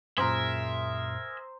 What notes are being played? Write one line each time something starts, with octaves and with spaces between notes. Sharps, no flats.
F#2 A#2 G#4 A#4 C5 E5 A#5